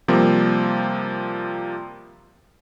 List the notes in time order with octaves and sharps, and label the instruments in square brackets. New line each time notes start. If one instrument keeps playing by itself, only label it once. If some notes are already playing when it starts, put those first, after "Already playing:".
[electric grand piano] C3 F3 G3 A#3 C4